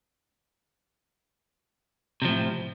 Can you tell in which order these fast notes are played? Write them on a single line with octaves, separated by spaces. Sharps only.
C3 F3 A2